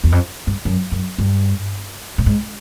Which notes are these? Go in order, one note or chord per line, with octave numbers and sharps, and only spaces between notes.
E2
F2
G2
F#2
F#2
G2
A2
G#2